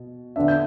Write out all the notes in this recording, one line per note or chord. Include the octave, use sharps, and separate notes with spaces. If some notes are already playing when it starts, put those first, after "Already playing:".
Already playing: B2
D3 B3 D4 E5
G6